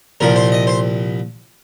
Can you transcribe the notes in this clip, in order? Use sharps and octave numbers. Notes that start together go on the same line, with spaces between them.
C2 A#2 F3 A#4
C5
D#5
C5